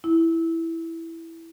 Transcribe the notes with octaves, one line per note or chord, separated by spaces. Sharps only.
E4